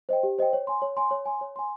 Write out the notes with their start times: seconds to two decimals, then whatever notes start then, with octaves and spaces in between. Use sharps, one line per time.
0.09 C5 D#5 G5
0.23 G4
0.38 C5 D#5 G5
0.53 C#5
0.67 G#5 C6
0.82 C#5
0.97 G#5 C6
1.11 C#5
1.26 G#5 C6
1.41 C#5
1.56 G#5 C6